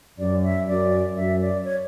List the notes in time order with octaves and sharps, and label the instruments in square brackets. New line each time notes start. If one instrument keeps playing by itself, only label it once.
[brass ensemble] F#2 [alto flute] D5
[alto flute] E5
[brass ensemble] F#2 [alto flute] D5
[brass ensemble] F#2 [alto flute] E5
[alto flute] D5
C#5